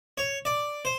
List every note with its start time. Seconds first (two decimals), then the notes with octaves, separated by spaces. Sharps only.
0.18 C#5
0.45 D5
0.85 C5